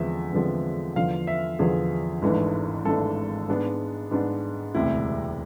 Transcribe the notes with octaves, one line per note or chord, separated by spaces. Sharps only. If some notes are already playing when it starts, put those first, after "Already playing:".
Already playing: E2 D3 F3 G#3 C4 E5
E2 D3 F3 G#3 C4
E2 D3 F3 F5
E5
E2 D3 F3 G#4
G#1 G#2 E3 A3 D4
G#1 G#2 E3 A3 D4 A4
G#2 G#3 B3 D4
G#2 G#3 B3 D4
E1 D2 C3 E4